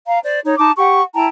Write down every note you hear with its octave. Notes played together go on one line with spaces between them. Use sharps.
F5 A#5
C5 D5
D#4 C#5
D#4 A5 D6
G4 F#5 C#6
E4 G5 A5 A#5